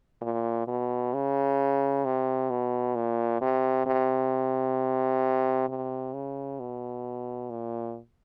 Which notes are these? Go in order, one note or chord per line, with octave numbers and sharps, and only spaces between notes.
A#2
B2
C#3
C3
B2
A#2
C3
C3
C3
C#3
B2
A#2